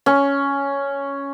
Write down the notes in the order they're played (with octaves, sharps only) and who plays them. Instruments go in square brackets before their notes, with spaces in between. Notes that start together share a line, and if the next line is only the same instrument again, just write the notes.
[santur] C#4